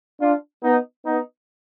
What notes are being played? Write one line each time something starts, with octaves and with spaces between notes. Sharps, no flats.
D4 F4
B3 D#4
B3 D#4